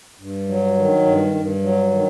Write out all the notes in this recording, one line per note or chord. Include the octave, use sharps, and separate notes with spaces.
G2
F#3
D#3
G2
G2
F#3
D#3